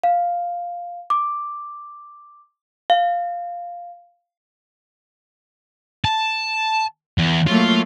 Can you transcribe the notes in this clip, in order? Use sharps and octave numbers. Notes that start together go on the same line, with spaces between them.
F5
D6
F5
A5
E2
F#3 A3 A#3 F4